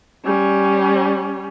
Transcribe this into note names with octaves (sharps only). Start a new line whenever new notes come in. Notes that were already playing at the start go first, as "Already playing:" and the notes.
G3 C#4